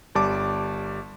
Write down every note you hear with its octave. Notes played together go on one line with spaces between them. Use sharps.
G1 G3 A5 D6